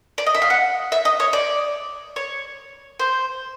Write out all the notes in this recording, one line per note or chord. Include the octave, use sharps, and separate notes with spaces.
D5
D#5
E5
F5
F#5
E5
D#5
C#5
D5
C#5
C5